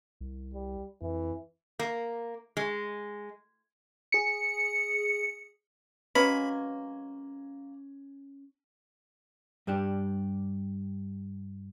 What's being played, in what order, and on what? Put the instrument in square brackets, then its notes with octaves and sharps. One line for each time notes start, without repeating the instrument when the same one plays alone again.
[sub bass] C2
[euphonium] G3
[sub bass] F2 [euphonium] E3
[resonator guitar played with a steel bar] A#3
G#3
[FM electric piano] G#4 C#7
[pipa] F#3 G#3 A#3 [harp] C#4 [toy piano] B4 [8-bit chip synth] B5
[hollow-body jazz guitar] G2 G3 D4 G4